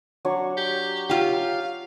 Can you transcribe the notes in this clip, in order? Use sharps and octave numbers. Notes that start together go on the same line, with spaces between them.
F#3 D4 C#5
G4
F4 G4 F5